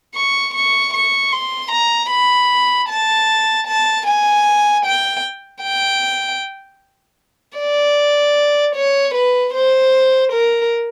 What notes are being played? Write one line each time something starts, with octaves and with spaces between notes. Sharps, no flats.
C#6
C#6
C#6
C6
A#5
B5
A5
A5
G#5
G5
G5
D5
C#5
B4
C5
A#4